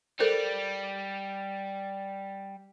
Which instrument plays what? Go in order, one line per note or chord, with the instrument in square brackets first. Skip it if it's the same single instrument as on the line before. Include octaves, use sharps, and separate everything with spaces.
[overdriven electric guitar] G3 [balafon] A4 A#4 C5